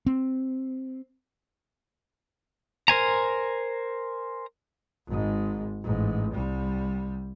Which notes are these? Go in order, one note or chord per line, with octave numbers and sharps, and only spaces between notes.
C4
A#4 C5 G#5 A#5
G#1 G#2
A1 G#2
C2 G3